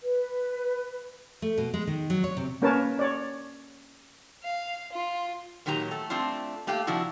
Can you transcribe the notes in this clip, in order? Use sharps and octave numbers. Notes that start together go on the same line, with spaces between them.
B4
A3
B2
G#3
D#3
F#3
C#5
C3
A#3 C#4 A#4 B4 C#5 A5
C#5 D5
F5
F4
A#2 D#3 F#3 G4 A#5
A3 A4
A3 C4 D4 F4
A3 A#3 G4 F5 G5
C3 F3 D4 E4 F#4